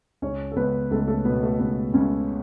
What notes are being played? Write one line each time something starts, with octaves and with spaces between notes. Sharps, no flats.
C#2 C#4 C#5
A4
C#2 B3 B4
C#2 A3 A4
A3 A4
B2 B3
A3
C#2 B3
C#2 C#3 C#4